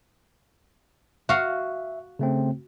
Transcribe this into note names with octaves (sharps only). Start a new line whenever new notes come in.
F#4 E5 F5
C#3 A3 C4